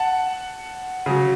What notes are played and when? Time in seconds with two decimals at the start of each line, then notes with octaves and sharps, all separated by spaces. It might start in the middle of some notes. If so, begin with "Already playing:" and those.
Already playing: F#5 A5
1.06 C#3 F#3